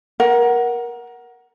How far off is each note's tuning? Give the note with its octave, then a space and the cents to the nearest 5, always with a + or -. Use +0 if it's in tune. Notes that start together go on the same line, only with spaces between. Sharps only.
A#4 +20 F#5 +0